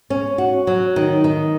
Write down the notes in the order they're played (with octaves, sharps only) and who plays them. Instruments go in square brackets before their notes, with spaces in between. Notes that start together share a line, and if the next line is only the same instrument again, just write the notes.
[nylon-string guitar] C#4
F#4
F#3
D#3
D#3